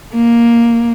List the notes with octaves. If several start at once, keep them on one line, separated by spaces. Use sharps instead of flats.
A#3